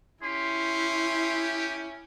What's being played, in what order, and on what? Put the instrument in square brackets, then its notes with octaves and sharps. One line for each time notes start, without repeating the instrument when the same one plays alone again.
[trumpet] C#4 [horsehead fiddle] E4 [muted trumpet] G4 [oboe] C6